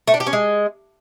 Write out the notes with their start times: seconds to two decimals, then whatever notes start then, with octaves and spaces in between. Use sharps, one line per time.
0.07 A3
0.14 D4
0.20 G4
0.27 C#4
0.33 G#3